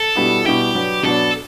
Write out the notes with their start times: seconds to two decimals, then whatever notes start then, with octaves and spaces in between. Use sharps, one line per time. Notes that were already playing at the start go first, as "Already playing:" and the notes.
Already playing: A4
0.16 B2 G3 B3 E4
0.44 B2 G3 B3 E4 G4
0.74 B2 F#3 B3 D4
1.03 B2 F#3 B3 D4 A4